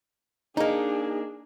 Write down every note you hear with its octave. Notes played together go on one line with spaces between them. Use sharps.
A#3 D4 D#4 G#4